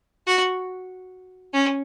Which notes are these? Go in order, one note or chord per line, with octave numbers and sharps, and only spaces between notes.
F#4
C#4